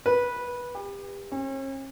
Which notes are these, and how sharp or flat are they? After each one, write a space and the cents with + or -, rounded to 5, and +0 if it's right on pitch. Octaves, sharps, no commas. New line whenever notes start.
B4 -15
G4 +30
C#4 -45